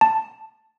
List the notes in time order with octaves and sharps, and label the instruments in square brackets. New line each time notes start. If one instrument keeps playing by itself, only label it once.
[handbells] A5